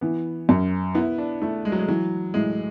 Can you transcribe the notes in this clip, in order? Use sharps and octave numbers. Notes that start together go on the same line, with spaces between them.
E3 B3
F#2
B3 E4
D4
A3 E4
G#3
F#3
G#3
E3 F#3
A2 G#3